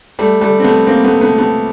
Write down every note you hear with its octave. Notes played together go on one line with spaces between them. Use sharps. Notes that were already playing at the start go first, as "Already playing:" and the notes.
G3 A3
G3 A3
C4
A3 B3
A#3 C4
A3 B3
A3 B3
A3 B3